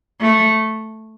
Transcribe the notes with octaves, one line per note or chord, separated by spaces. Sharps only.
A3